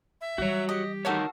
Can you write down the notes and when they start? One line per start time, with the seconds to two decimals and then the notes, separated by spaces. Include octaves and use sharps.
0.21 E5
0.38 E3 G3 F#4 C#5
0.69 G4 D#5
1.05 D#4 F#4 A4 A#4 C#5 F5